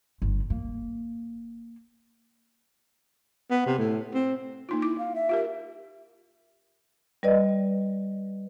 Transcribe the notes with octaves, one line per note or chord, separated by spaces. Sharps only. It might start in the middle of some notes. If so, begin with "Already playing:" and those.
G1
A#3
B3
C3
A2
C4
A#3 D#4 F4
E4 D6
F5
E5
F4 G4 A#4
G3 B4 D5 D#5